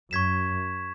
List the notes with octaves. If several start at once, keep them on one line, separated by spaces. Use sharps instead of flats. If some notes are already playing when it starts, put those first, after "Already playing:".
F#2 C#6 G#6 B6 E7